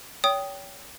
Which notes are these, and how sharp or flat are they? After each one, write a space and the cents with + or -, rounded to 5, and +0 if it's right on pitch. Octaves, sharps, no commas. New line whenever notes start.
C#5 +30 G5 +0 D#6 +5